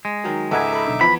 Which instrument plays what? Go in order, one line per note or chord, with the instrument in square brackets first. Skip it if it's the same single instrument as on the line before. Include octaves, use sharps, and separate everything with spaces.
[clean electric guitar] G#3
[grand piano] D#3 F#3
[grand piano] C#2 G#2 [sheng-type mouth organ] D#4 E5 D6 [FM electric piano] A4 F#5 G#5
[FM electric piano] A4 B5
B1 D3
[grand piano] E2 [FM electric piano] F3 [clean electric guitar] B5